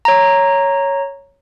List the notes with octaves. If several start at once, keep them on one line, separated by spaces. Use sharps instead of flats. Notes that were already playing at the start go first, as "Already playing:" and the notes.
C#5 A#5